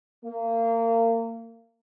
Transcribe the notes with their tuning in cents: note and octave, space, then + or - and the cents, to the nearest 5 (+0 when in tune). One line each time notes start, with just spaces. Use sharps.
A#3 -30